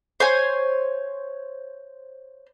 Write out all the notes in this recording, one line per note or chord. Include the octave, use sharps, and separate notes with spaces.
C5 C#5 G#5